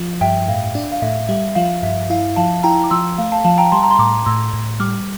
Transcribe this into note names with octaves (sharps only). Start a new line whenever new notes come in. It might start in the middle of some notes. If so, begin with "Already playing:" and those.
Already playing: F3
G2 E5 G5
A2 F5
D4
F5
A2 E5
G3 E5
F3 F5
G2 E5
E4 F5
F3 F5 A5
E4 G5 A#5
D6
F3 C6 E6
A3 F5
F5 A5
F3 F5 A5
G5 A#5
G3 A5 C6
A#5
C6
A2 A#5 D6
D6
A2 C6 E6
A2
G3 D6 F6